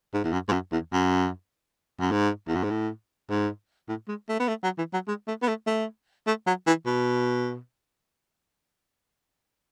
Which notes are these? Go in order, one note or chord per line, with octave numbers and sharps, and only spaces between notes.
G#2
E2
F#2
G#2
F#2
E2
F#2
F#2
G#2
E2
F#2
G#2
A2
G#2
A2
G#3
A3
B3
A3
F#3
E3
F#3
G#3
A3
B3
A3
A3
A3
F#3
E3
B2